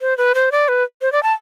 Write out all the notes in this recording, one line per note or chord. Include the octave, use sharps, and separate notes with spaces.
C5
B4
C5
D5
B4
C5
D5
A5